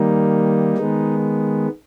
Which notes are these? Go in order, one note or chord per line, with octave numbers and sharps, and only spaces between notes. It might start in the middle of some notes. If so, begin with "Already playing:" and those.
Already playing: D#3 G3 A#3 D#4
D#3 G#3 B3